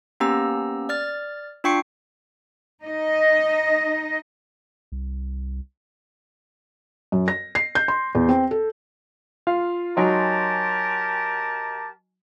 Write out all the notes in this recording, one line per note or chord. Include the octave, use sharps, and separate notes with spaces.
A#3 B3 C#4 G4 A#5 E6
D5 F6 A6
D4 F4 G5 C#6 C7 C#7
D#4 D#5
C2
F#2
A#6
C7
G6
C6
E2
C4
A4
F4 F5
F#3 D#4 G4 A#4 G#5 A5 C6